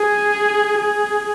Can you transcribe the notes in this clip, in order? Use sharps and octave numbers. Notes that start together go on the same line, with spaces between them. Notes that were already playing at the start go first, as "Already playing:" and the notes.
Already playing: G#4
G#4